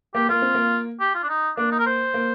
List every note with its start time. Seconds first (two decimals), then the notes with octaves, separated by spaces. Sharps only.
0.15 A#3 G4
0.29 A#3 F4
0.42 C4
0.55 A#3
1.01 G4
1.15 F4
1.23 D4
1.29 D#4
1.57 A#3 D4
1.72 D#4
1.79 A#4
1.86 C5
2.14 A#3